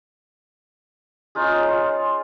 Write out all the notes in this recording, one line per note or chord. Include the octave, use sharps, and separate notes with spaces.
C#4 D#4 F4 G#4
F4 F5